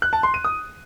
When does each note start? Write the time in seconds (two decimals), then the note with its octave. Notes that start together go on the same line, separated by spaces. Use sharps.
0.02 F#6
0.13 A5
0.23 C6
0.34 D#7
0.45 D#6